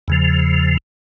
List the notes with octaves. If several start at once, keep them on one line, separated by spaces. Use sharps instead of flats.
E2 C#3 F3